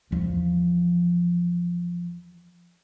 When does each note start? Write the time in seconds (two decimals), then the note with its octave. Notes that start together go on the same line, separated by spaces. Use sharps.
0.11 E2 F3